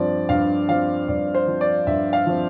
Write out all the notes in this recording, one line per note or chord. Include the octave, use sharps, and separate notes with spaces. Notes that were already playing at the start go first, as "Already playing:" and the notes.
Already playing: G2 F3 C4 D5
G2 F5
F3 C4 F5
G2 D5
C5
F3 C4
D5
G2 E5
F5
F3 C4